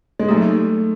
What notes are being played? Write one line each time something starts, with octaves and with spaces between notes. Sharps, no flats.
G#3
F#3 A3 A#3 D#4 G4